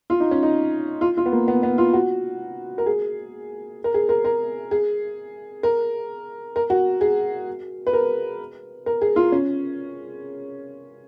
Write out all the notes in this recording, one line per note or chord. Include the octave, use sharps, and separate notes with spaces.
F4
D#4
C#4
D#4
F4
F4
B3
A#3
B3
B3
F4
F#4
A#4
G#4
A#4
G#4
A#4
A#4
G#4
A#4
A#4
F#4
G#4
B4
A#4
A#4
G#4
F4
C#4